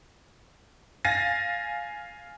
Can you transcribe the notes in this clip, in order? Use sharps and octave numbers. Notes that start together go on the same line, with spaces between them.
F5 G#5 A6 A#6 D#7